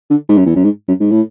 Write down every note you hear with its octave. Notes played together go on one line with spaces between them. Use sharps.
D3
G#2
F#2
E2
F#2
G#2
F#2
G#2
A2